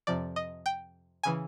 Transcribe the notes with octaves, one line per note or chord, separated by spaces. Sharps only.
F2 C3 F3 D5
D#5
G5
C#3 E3 G#5